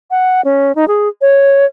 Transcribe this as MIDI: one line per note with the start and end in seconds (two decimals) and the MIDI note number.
0.11 0.41 78
0.45 0.75 61
0.75 0.85 63
0.88 1.08 68
1.21 1.66 73